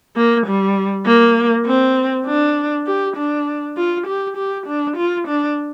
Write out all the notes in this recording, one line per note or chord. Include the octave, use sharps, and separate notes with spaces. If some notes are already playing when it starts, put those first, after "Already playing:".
A#3
G3
A#3
C4
D4
G4
D4
F4
G4
G4
D4
F4
D4